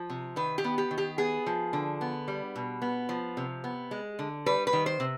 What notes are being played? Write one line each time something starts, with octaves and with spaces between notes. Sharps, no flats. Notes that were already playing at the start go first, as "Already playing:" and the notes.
Already playing: F3
C3
D#3 B4
G4
B3
G4
D#3
G4
B3 G#4
F3
D3
B3
G3
B2
B3
F3
C3
B3
G#3
D3
G3 B4
B4
D#3
C5
C3